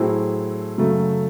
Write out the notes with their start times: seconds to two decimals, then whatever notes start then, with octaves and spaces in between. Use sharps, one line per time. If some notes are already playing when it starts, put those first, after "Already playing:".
Already playing: A2 F#3 C4 E4 G#4
0.78 F#2 C#3 F#3 A3